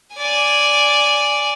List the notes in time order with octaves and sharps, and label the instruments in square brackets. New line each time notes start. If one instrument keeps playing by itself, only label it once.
[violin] D5 G#5